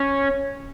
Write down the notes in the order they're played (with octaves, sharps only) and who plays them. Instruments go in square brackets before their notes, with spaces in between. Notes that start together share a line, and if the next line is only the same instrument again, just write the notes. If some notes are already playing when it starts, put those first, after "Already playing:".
Already playing: [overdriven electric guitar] C#4